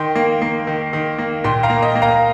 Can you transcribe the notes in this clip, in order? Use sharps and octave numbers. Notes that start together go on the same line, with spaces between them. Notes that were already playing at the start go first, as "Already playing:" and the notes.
Already playing: D#3 G5 C6
A#3
A#3
D#3
D#3
A#3
A#2 G5 C6
F5 A#5
A#3
D#5 G5
A#3
F5 A#5